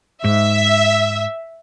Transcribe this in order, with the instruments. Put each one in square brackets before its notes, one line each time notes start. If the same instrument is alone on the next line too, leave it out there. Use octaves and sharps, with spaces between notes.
[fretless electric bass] G#2 [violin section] E5